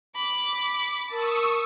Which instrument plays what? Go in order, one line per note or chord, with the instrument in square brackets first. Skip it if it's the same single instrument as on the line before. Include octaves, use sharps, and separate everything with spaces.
[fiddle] B5 [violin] D6
[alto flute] A#4 [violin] A5 [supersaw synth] C#6 D#6 E6